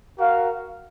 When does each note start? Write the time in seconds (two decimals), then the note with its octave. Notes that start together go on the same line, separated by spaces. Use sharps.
0.18 F#4 A#4 F5